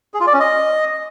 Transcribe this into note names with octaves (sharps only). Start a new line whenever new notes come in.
G#4
F4
D5
C#4
D#5